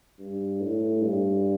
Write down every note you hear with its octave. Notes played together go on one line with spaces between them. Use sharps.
G2
A2
G2